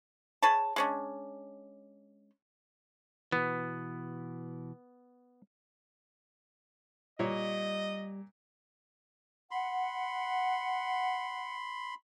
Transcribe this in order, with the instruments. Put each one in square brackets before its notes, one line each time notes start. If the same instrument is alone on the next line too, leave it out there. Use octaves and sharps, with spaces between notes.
[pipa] G#4 B4 C#5 A5
G#3 C#4 D4
[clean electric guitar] B2 E3 [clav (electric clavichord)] B3
[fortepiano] A#2 C#5 [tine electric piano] G3 [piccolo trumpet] D#5
[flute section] F#5 [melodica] B5 C6